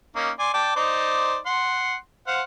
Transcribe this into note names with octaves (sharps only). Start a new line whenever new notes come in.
A#3 C#4 D#4
D5 G#5 C6
D5 G5 A5
D#4 C5 D5
F#5 C6
C5 F5 F#5